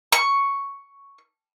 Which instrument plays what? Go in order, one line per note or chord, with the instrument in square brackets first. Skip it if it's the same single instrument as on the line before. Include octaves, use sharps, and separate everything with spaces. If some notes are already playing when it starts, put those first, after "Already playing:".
[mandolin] C#6